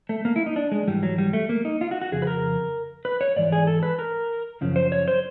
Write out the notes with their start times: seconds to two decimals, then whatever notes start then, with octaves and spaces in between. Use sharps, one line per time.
0.09 A3
0.25 A#3
0.36 E4
0.46 D#4
0.56 D4
0.72 G#3
0.87 G#2 E3 G3
1.03 F#3
1.18 G3
1.33 A3
1.49 A#3
1.65 D#4
1.81 F4
1.91 F#4
2.01 F#4
2.12 F2 C#3 G#4
2.22 B4
2.27 A#4
3.05 B4
3.21 C#5
3.36 G#2 E3 D5
3.52 G#4
3.67 A4
3.83 B4
3.99 A#4
4.61 F#2 C#3 F3
4.76 C5
4.92 C#5
5.08 C5